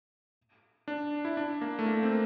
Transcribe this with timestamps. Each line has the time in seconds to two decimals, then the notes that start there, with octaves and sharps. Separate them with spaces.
0.88 D4
1.25 E4
1.37 D4
1.61 A#3
1.79 A3
1.86 A#3
2.03 C4